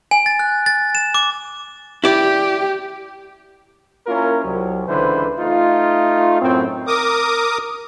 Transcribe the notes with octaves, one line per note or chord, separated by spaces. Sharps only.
G#5
A6
F#6
A6
E7
D6
E4 G4 D5
A#3 C#4 E4 F4 A#4
C2 F#3
C#2 D3 E3 B4 C5
A3 D#4 F4
F#2 A2 C4
A#4 D6 D#6